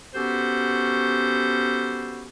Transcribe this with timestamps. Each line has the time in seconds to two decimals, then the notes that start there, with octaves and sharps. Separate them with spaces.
0.14 B3 C#4 F#4 G4 A4 C5